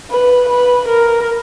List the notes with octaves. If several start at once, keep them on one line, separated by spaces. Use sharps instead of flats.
B4
B4
A#4